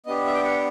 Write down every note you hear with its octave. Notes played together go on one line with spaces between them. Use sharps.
B3 D4 G4 D#5
E5
G5
F#5